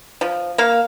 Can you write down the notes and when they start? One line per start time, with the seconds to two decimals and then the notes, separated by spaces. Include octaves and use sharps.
0.21 F3
0.58 A#3 F5